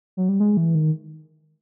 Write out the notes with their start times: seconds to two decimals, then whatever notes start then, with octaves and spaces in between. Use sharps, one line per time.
0.17 F#3
0.29 G3
0.40 G#3
0.57 E3
0.75 D#3